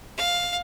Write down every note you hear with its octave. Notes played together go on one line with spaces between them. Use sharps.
F5